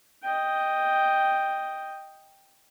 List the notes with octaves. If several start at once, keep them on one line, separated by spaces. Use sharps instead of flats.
D#5 G5